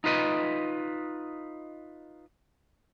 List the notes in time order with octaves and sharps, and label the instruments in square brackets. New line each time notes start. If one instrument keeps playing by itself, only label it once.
[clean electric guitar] D#4 F4 B4 D#5